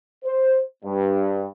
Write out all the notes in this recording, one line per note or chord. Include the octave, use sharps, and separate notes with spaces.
C5
G2